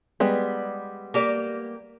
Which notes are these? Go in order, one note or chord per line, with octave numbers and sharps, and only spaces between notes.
G3 G#3 B3
A#3 G4 D5